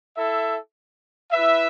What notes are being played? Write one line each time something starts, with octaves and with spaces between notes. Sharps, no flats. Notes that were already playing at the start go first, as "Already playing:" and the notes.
E4 A4 E5
E4 B4 E5